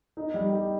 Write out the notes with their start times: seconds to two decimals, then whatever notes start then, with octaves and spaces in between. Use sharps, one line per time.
0.17 D#4
0.34 G3
0.52 G4